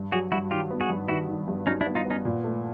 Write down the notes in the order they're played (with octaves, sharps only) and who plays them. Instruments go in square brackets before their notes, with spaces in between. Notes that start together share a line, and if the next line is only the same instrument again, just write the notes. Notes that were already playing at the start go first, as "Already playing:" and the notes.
Already playing: [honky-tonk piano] G2
[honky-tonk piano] F#3 [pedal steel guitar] F#4 G#4
[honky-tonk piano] G2 [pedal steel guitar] E4 F#4
[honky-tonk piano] D#3 [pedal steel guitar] F4 G4
[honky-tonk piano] B3
[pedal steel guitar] F#4 G#4
[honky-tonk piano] G2
[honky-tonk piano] D#3 [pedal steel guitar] E4 F#4
[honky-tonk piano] D#3
G2
[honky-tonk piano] F#3 [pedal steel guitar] C#4 D#4
[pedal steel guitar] D4 E4
[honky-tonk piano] B3
[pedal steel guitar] D#4 F4
[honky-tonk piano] B3
[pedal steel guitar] C#4 D#4
[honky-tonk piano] A#2
A3